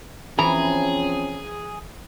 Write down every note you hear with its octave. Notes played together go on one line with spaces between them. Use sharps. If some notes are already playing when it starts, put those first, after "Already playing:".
E3 F3 C4 C#4 G#4 A#5